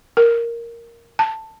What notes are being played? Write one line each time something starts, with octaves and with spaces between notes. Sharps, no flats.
A#4
A5